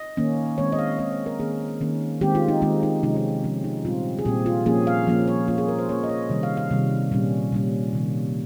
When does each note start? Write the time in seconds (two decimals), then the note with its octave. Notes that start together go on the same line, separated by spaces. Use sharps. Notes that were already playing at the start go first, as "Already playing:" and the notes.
Already playing: D#5
0.17 D#3 A#3 C#4
0.58 D#3 G#3 C4 C#5
0.72 D#5
0.79 F5
0.99 D#3 G#3 C4 D#5
1.12 C#5
1.26 A#4
1.40 D#3 A#3 C#4 G#4
1.81 D#3 A#3 C#4
2.21 D#3 G#3 C4 G4
2.35 F4
2.48 D#4
2.62 D#3 G#3 C4 D#4
2.83 D#4
3.03 C3 F3 G#3 C#4 D#4
3.16 D#4
3.44 C3 F3 G#3 C#4
3.64 D#4
3.85 A#2 G3 C4 F4
4.19 G#4
4.25 A#2 G3 C4 G4
4.46 F4
4.66 F3 A#3 C#4 G#4
4.87 F5
5.07 F3 A#3 C#4
5.28 C#5
5.48 F3 A#3 C#4 F4
5.58 G#4
5.68 A#4
5.79 C5
5.89 F3 A#3 C#4 C#5
6.04 D#5
6.09 C#5
6.30 C3 D#3 G3
6.43 F5
6.57 F5
6.71 C3 D#3 G3
7.12 A#2 G3 C#4
7.52 A#2 G3 C#4
7.93 C3 D#3 A#3